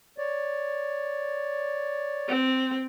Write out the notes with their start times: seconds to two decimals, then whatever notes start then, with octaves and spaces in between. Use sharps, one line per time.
0.18 C#5 D5
2.29 C4